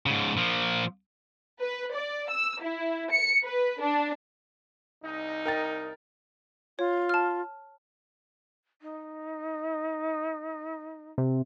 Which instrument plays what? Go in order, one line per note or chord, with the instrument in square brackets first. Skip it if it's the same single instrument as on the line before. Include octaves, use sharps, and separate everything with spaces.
[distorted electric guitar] G#2 C#3
A#2 F3
[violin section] B4
D5
E6
E4
C#7
B4
D4
[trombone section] C2 D#4
[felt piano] A#4 G5 A6
[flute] F4 [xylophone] C#5
[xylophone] A5 F6
[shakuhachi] D#4
[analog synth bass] C3